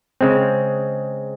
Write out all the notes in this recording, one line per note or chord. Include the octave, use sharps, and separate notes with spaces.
C#3 G#3 C4